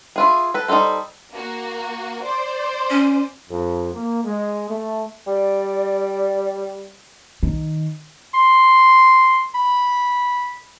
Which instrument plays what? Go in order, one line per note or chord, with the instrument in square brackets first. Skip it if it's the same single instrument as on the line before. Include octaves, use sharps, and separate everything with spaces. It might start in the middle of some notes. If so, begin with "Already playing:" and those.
[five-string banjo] E4 F4 G#4
A4 B4
G3 D#4 F4 A4 C5
[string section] A#3 F#4
C5 D5
[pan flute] C#4
[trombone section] F2
A#3
G#3
A3
[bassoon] G3 [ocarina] D5
[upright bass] D#3
[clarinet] C6
B5